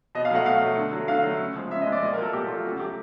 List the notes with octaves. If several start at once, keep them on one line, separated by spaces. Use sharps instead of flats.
B2 D#5
F5
F#3 A3 F#5
B2 F5
F#3 A3
D3
F#3 A3
D3 F5
F#3 A3
C#3
F3 G#3
C#3 E5
D#5
F3 G#3
D5
A#2 D#5
A#4
F#3 A3 A4
A#2 G4
F#3 A3 F4
C#3 F#4
F#3 A3 G4